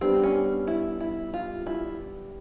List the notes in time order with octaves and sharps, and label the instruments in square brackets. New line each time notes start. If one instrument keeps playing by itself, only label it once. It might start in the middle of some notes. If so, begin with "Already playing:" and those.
[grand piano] G3 B3 D4 [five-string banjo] C4
[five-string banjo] C#4
E4
E4
F4
E4